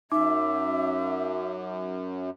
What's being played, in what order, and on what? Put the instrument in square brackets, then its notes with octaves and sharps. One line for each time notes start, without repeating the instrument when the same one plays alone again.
[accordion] F#2 [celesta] D#4 [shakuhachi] E5 [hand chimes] D6